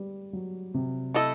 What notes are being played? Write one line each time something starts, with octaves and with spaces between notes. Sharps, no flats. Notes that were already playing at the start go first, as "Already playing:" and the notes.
Already playing: G3
F#3
C3
A3 E4 A4 D#5